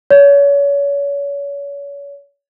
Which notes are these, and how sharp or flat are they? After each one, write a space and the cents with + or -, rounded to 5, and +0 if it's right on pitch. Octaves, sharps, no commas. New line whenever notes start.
C#5 +35